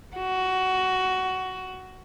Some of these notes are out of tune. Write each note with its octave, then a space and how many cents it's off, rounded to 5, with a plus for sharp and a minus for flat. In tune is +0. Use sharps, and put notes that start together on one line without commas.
F#4 +15